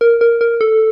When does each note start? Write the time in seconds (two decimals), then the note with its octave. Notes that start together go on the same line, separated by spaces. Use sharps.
0.01 A#4
0.21 A#4
0.41 A#4
0.61 A4